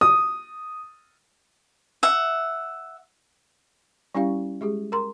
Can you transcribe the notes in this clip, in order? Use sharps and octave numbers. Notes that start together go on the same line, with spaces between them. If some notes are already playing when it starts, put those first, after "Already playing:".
D#6
E5 F#5
G3 C#4 E4 G4 F5
G#3 G4 G#4
A#4 A#5 C6